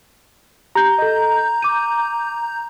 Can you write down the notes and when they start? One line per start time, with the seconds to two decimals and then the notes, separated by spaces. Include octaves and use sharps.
0.75 G4 A#5 G6
0.98 A4 D#5
1.62 D6 D#7